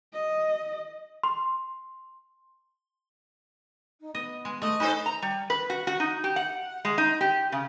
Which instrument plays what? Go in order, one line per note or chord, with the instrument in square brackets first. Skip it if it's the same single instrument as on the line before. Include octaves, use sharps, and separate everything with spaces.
[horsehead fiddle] D#5
[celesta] C6
[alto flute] D#4
[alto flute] B3 [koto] D#5
[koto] G#3
[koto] A3 [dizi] D#5
[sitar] D#4 A4 C5 [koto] B4 [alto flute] G#5
[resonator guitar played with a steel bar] A#5
G3
B4
F#4
F#4
D#4
G4
F#5
G#3
D#4
G4
C#3